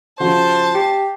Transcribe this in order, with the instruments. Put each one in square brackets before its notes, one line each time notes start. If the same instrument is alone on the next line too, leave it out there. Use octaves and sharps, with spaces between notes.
[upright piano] C#3 F3 F#4 [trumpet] C5 [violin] A5
[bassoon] G4 [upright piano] D6 C7